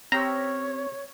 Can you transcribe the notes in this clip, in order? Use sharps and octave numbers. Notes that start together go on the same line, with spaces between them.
C4 C#4 G4 C#5 A#5 E6